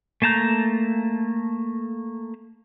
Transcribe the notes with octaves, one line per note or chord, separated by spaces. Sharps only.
A3 A#3 A5 A#5 G6